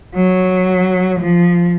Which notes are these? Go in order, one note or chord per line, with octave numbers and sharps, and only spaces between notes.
F#3
F3